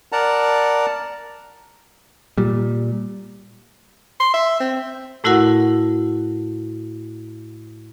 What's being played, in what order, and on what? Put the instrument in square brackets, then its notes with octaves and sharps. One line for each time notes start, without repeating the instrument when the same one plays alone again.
[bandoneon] A#4 D5 F#5 A5 A#5
[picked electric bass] A#2 G3
[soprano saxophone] C6
E5
C4
[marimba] A2 A3 E4 F#4 A#4 F#5